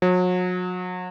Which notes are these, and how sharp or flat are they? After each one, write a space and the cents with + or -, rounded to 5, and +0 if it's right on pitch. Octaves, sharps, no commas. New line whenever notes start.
F#3 -35